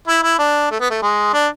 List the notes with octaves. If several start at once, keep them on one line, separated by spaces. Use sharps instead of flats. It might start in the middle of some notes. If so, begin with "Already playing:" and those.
E4
E4
D4
A3
B3
A3
G#3
D4